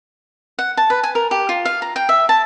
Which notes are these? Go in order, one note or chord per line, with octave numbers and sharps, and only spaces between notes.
F#5
A5
B4
G#5
A#4
G4
F4
F5
A#5
G5
E5
A5